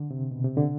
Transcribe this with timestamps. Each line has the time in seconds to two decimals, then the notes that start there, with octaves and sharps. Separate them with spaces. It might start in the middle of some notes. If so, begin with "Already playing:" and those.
Already playing: D3
0.11 C3
0.31 B2
0.44 C3
0.57 D3